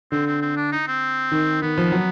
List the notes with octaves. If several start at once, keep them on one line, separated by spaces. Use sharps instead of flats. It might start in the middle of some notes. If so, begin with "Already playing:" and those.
D3 C4
C4
C4
D4
D#4
C4
D#3
D#3 B3
F3
F#3